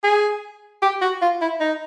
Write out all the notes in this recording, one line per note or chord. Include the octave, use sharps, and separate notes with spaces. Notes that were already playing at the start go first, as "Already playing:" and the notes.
G#4
G4
F#4
F4
E4
D#4